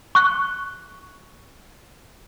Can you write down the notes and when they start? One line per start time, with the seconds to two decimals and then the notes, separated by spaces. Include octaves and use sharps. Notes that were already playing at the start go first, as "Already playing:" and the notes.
0.15 C#6 F#6